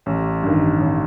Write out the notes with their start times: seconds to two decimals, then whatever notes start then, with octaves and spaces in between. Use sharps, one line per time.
0.06 A1
0.43 G2 D#3
0.80 A1